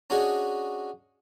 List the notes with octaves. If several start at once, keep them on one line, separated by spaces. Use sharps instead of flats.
C#4 D4 F#4 G#4 D#5